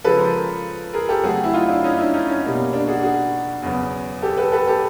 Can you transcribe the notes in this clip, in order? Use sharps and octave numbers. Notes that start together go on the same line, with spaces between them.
C#3 F3 G#3 A4 B4
A#4 C5
G#4 A#4
G4 A4
C#3 F#3 A3 C4 F#4 G#4
E4
D#4 F4
D4 E4
C#4 D#4
D4 E4
C#4 D#4
C#4 D#4
B2 G3 A#3 C#4
D4
F#4 G#4
F#4 G#4
E2 C#3 F#3 B3
G4 A4
A4 B4
A4 B4
G4 A4